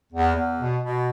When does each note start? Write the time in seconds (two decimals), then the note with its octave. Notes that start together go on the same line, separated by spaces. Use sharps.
0.13 E2
0.36 E2
0.59 B2
0.82 B2